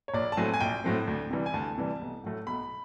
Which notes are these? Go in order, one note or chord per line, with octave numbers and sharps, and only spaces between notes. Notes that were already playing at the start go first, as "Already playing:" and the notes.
C#5
A#1 D5
A5
A2 F#3 A3 C4 G#5
G#5
A#1 G5
A2 F#3 A3 C4
D2
C3 E3 G3
G#5
D2 A5
C3 E3 G3
B1
A2 F#3 A3
B1 B5